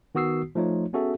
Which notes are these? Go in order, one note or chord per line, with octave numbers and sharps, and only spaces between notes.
D#3 B3 F#4 D#6 E6 C7
F3 A3 D#4 F4 C#5
B3 C#4 F#4 G#4 A4 E5